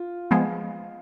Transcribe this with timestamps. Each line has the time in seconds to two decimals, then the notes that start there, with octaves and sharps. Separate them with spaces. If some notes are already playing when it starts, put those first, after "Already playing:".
Already playing: F4
0.31 F3 G#3 B3